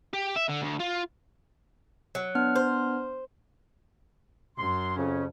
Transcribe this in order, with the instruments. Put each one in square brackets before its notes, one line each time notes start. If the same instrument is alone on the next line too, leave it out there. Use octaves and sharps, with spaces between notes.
[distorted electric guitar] G4
E5
D3
D2
F4
[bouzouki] F#3
[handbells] B3 D4 F6
[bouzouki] C5
[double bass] F#2 [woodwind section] C6
[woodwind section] F2 C#3 C#4